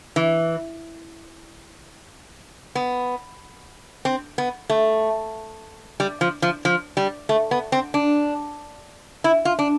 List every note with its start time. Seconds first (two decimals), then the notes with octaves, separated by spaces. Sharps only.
0.16 E3
2.75 B3
4.05 C4
4.38 B3
4.70 A3
6.00 G3
6.21 F3
6.42 F3
6.65 F3
6.97 G3
7.29 A3
7.51 B3
7.72 C4
7.94 D4
9.24 E4
9.45 F4
9.59 D4